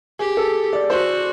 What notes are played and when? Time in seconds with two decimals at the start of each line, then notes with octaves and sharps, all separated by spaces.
0.19 G4 G#4
0.37 A4
0.73 D5
0.90 F#4 C5